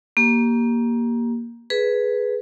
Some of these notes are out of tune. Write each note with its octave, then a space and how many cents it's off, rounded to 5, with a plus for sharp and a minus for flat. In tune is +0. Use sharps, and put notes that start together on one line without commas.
A#3 +15 G4 +0
G#4 +10 B4 +0